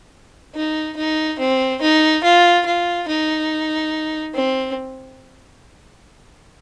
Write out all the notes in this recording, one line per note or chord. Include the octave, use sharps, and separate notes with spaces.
D#4
D#4
C4
D#4
F4
F4
D#4
C4